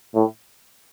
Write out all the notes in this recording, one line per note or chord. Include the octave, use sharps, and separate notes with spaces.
A2